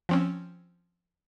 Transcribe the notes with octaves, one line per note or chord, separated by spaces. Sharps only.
F3 C4 C#4